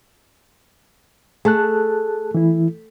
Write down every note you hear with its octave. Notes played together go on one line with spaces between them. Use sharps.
A3 G#4 A5 F#6
E3 E4